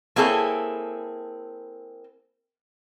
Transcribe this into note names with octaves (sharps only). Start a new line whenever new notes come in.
A#3 C4 E4 G#4 A4 C#5